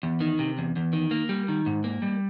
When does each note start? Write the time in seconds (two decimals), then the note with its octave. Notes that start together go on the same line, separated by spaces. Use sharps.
0.03 E2
0.20 D#3
0.39 C3
0.58 E2
0.76 E2
0.93 D#3
1.11 A#3
1.29 G3
1.48 D#3
1.66 G#2
1.84 A#3
2.02 G3